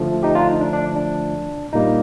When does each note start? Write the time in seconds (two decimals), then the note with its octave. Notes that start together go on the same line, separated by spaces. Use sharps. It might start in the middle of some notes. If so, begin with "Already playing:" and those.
Already playing: D3 F3 A3
0.23 D#4 G4
0.35 D4 F4
0.49 D#4
0.61 D4
0.73 D4
0.96 D4
1.73 A#2 G3 A#3 D#4